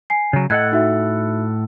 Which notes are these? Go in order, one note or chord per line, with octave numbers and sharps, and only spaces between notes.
G#5 C7
C#3 F#3
A2 A4 D#5 F#5 F#6 G#6
D#4 F#4 E5